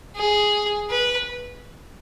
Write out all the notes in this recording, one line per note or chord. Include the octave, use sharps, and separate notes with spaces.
G#4
B4